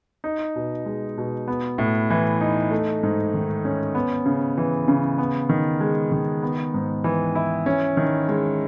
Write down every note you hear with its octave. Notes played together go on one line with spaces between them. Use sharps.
D#4
B2
G#3
B2
B3
A2
E3
D#4
A3
G#2
D#3
C#4
B3
C#3
E3
C#3
B3
D#3
G#3
D#3
B3
G#2
E3
E4
C#4
D#3
G#3